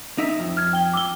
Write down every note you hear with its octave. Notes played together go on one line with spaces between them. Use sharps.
D#4 E5
F2
F6 G#6
G5 G7
D6 E6 G7